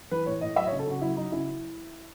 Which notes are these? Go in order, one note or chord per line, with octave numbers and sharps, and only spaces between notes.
E3 B4
A2 C#5
A2 D#5
F#3 E5
D#5
C#5
C#3
A4
C#3 F#4
F#3 E4
F#3 D#4
C#3 E4